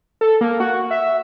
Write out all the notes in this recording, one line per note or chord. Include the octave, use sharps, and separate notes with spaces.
A4
A#3
F#4
E5